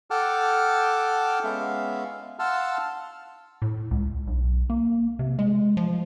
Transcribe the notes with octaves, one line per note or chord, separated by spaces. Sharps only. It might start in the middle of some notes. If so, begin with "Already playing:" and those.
A4 F#5 G5 A5 D6 F6
G#3 B3 C#4 E5 F5
F5 F#5 A5 C6 E6 F6
A2
C#2
B1
A#3
C3
G#3
F3